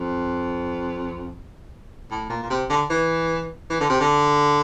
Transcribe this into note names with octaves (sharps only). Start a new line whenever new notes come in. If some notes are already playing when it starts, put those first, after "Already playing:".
Already playing: F2
A2
A#2
A#2
C3
D3
E3
E3
D3
C3
D3